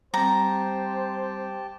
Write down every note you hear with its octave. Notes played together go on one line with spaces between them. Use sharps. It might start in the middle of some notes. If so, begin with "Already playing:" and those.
G3 C4 G4 C5 G5 A5 A#5